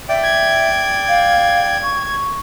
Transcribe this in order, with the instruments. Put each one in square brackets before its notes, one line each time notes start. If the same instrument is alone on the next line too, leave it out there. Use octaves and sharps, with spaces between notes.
[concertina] D5 G5 [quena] E5
[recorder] G#6
[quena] F5
C#6